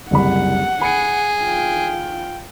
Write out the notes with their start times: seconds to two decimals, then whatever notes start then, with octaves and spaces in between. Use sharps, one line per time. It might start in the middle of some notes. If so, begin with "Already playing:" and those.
0.11 F#1 C2 F#5 B5
0.82 G#4 B5 C#7
1.41 F4 G5